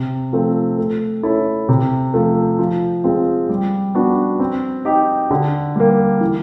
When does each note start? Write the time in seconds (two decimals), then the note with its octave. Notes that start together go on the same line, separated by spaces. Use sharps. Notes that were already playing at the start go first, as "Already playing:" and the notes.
Already playing: C3
0.33 F3 A3 C4
0.78 A3
1.23 C#4 E4 A4
1.69 C3
2.14 F3 A3
2.59 F3
3.04 G#3 C4 F4
3.49 G3
3.95 B3 D4 F#4
4.40 C4
4.85 D#4 G4
5.31 D3
5.76 G3 A#3
6.21 E3